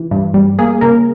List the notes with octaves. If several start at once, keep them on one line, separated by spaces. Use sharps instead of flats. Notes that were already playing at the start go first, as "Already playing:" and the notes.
Already playing: E3
G2
G3
A#3 G#4
C#3 A#4